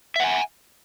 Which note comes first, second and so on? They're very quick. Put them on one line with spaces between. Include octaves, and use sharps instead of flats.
E5 F#5 G#5